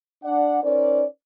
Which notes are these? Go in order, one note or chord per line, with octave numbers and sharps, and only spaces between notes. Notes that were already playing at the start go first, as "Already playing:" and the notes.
D4 D5 F#5
C#4 D#4 A#4 C5 D5